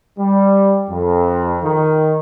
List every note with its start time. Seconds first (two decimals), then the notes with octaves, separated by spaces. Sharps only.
0.19 G3
0.89 F2
1.64 D#3